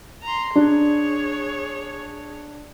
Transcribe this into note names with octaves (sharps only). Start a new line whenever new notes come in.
A#5 C6
D4 G#4 C#5